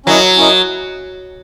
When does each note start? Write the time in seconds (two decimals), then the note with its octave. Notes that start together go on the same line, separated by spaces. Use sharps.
0.06 F#3 C#4 E4 A#4 D#5
0.37 C#4 E4 A#4 D#5